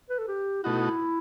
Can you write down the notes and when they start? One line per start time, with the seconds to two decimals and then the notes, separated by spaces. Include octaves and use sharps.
0.10 B4
0.18 A4
0.28 G4
0.63 B2 A3 D#4 E4 F#4